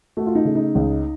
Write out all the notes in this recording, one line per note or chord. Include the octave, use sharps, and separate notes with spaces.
A3 F#4
F4
D#4
C#3
D#4
C#2